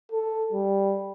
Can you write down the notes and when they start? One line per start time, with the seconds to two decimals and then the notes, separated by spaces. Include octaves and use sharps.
0.12 A4
0.53 G3